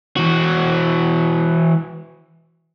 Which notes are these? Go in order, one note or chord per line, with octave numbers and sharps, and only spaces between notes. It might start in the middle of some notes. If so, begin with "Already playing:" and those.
E3 F#4